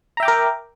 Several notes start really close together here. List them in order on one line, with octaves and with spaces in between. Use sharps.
A#5 E5 G5 D6 A#4